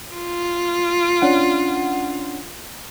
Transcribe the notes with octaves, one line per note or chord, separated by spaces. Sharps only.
F4
C#4 D4 F#5